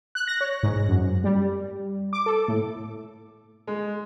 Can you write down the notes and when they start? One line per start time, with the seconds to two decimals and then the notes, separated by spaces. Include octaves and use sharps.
0.15 F#6
0.27 A#6
0.41 C#5
0.63 G#2
0.89 F#2
1.24 G3
2.13 D6
2.26 A4
2.48 A2
3.67 G#3